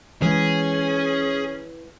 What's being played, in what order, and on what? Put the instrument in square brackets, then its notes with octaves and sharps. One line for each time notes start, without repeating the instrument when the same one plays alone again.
[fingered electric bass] E3 G#3 [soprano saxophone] C#4 [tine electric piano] E4 B4 [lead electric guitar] G#4